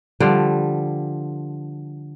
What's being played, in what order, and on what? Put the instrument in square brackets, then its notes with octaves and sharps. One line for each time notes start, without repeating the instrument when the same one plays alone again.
[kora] D3 F3 G3